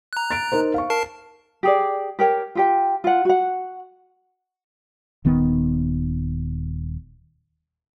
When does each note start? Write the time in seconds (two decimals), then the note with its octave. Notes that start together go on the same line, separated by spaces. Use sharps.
0.13 A#5 F#6
0.31 A6 D7
0.52 D#4 A#4 C5
0.74 F5 C#6
0.90 A#4 A5 C7
1.63 G4 G#4 D5
2.19 G4 A#4 C#5 G5
2.55 F4 G4 G5
3.04 F4 F#5
3.25 F#4 F#5
5.25 D#1 D#3 B3